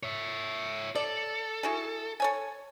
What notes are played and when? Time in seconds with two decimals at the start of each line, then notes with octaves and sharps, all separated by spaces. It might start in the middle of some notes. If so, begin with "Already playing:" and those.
0.03 C#5 E5
0.95 A4 D5
1.63 E4 F#4 G#4
2.20 A4 C#5 G#5